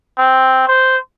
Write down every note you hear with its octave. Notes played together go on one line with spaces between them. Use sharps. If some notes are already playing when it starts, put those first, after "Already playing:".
C4
C5